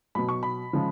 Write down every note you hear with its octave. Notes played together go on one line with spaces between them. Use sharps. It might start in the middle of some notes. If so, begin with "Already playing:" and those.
B2 F#3 B5
C#6
B5
C#3 F3 G#3